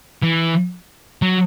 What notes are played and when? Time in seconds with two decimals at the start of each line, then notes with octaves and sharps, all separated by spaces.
0.23 E3
1.22 F#3